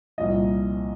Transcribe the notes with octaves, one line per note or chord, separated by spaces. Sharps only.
C2 A#2 F3 D#5